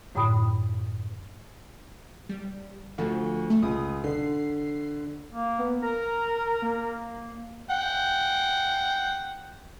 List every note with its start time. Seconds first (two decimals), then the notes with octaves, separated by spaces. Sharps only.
0.15 F#2 A2 D3 G5 B5 D#6
2.29 G3
2.98 D2 F3
3.50 A3
3.63 C#2 D#6
4.04 D3 C7
5.31 A#3
5.59 B3
5.83 A#4 A#5
6.62 A#3
7.70 F#5 G5